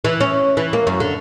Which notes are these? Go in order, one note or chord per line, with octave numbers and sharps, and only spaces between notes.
E3
C#4
E3
A#3
F#2
D3